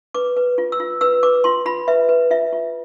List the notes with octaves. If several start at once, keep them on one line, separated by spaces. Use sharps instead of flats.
B4 D6
B4
F4
E6
F4
B4 E6
B4 D6
F4 C6
F4 B5
B4 E5
B4
F4 E5
F4